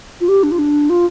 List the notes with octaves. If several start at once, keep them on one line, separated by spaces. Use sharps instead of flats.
F4
G4
D4
F4
D4
F4